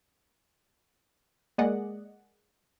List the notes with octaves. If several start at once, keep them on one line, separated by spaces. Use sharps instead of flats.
G#3 A#3 G#4 D5 D#5 F#5